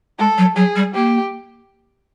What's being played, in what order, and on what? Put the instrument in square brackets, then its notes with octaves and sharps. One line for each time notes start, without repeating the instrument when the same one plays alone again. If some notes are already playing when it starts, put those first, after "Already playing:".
[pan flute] G#3 [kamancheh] A4
[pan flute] F#3
[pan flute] F#3 [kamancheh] G#4
[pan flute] G3
[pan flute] A#3 [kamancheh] G4